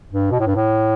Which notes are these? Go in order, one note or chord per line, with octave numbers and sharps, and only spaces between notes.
G2
B2
A2
G2
A2